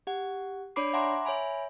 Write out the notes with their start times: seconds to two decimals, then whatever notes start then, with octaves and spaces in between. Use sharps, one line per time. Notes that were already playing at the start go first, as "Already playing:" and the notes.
0.07 G4 F#5
0.76 D4 C#5 D5 B5 D6 C7
0.93 E5 F#5 G#5 A#5 C6 D6
1.25 C#5 E5 G#5 B5